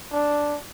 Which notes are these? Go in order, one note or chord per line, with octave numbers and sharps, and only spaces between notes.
D4